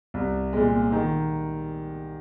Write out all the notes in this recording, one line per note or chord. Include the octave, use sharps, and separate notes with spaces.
C2
A#2 G#3
D#3